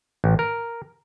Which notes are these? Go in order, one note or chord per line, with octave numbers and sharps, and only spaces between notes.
A1
A#4